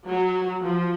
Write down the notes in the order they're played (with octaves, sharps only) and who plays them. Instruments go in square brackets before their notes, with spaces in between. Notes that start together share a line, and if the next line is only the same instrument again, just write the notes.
[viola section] F#3
F3